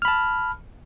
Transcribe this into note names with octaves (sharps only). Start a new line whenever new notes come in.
A5 B5 F6